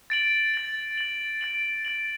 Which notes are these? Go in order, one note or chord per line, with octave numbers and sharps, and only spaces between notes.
A6 D7 F#7
A6 F#7
A6 F#7
A6 D7 F#7
A6 D7 F#7